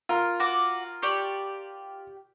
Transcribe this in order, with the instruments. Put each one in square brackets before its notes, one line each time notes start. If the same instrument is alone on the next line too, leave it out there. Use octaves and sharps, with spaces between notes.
[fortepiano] F4 A#4
[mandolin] F#4 D6
G4 D5 C#6